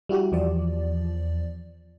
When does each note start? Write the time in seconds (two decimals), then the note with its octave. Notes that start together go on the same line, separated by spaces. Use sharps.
0.09 G3 E4 F#4 G4
0.32 E2 F3 D5